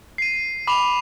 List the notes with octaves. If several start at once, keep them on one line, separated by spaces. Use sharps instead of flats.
C7 D#7
B5 D6 F7